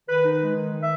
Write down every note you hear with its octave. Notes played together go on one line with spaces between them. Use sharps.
D#3 B4
D#4
B4
G#3
D#3
D#3
E5